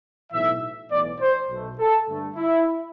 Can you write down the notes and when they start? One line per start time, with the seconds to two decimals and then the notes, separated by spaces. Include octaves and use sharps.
0.32 B1 A2 E3 E5
0.90 B1 A2 E3 B3 D5
1.20 C5
1.49 B1 B2 A3
1.79 A4
2.07 G2 D3 A3
2.36 E4